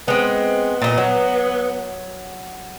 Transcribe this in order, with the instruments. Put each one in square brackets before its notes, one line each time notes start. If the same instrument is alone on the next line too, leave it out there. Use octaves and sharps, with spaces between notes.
[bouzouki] G#3 C4 [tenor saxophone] B3
[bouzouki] A#2 D#5
F#3